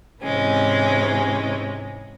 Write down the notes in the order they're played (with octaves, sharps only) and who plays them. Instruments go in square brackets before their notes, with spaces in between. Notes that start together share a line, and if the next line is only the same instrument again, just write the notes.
[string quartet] G#2 C3 E3 G#3 C#4